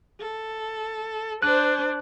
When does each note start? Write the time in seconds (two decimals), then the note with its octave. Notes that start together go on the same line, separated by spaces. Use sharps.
0.20 A4
1.42 D4 C5 F#6